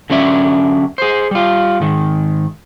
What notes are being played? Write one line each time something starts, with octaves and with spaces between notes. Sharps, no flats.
D3 F#3 C#4 D5 E5
G#4 C5
G3 F4
G#2 D#3